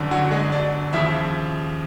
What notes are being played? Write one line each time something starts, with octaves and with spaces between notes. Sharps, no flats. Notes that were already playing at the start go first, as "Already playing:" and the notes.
Already playing: G1 F#2 D3
F#3 F#4
G#3 G#4
D4 D5
D#2 C#3 F3 E4 E5